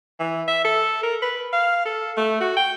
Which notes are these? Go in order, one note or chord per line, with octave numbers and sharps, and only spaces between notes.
E3
E5
A4
A#4
B4
F5
A4
A3
F#4
G5